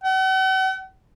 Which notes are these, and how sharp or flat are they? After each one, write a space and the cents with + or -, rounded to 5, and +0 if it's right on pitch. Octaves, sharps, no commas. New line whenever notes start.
F#5 +45